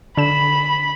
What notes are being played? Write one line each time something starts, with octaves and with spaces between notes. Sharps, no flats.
D3 B5 E7